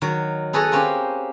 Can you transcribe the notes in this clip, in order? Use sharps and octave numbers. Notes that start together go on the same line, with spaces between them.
D#3 F#3
B3 G#4 A4 B4 C#5 D#5
A#3 C4 C#4 G4